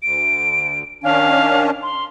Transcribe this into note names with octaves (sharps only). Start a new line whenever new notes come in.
D2 D7
D#3 C#4 D4 F5
C6